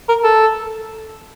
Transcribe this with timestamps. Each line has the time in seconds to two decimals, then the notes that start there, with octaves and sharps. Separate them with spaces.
0.09 A#4
0.24 A4